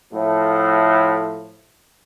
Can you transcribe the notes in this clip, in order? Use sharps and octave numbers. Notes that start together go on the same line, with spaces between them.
A2 F3 A3